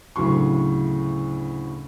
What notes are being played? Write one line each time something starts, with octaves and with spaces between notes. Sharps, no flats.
D2 A2 C#3 F#3 C6 C#6